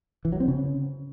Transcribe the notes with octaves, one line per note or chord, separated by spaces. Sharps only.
E3
F#3
C4
C#3